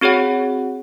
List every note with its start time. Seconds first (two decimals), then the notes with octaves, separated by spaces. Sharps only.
0.01 C4 F#4 G#4 C#5 F#5